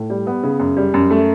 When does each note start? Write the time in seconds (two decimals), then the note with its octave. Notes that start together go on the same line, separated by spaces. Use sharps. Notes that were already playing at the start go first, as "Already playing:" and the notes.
Already playing: A2
0.10 G3
0.27 B3
0.43 C#3
0.60 F#2
0.77 G3
0.94 F#2
1.10 A3